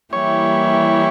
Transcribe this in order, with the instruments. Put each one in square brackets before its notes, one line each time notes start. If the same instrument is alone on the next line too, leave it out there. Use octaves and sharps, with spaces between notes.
[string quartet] E3 G3 A#3 E4 G4 [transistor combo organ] C#5